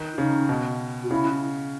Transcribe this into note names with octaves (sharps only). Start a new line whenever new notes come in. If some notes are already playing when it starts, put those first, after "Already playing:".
Already playing: D#3
E4
C#3 D#4
B2
F#4
C#3 E4